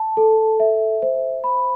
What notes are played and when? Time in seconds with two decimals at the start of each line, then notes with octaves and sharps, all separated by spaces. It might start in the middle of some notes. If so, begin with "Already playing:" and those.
Already playing: A5
0.17 A4
0.60 E5
1.02 C5
1.44 B5